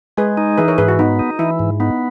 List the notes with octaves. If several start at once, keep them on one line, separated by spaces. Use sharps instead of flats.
G#3 G#4 B4
D#4
E3 G#4 B4
A#4 C#5
G#2 G#4 B4
F#4
B3 D#4
D#4
E3 E4
G#2
B3 D#4